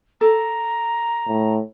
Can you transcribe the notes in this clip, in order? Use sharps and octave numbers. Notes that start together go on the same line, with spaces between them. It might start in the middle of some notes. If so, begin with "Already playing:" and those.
A4 A#5
A2